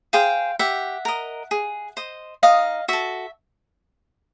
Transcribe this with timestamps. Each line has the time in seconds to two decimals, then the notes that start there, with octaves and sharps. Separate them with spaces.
0.13 G#4 C5 F5 G5
0.59 G4 E5 F#5
1.05 A#4 D#5
1.51 G#4
1.97 C5 D#5
2.43 D#4 D#5 F5
2.88 F#4 A4 E5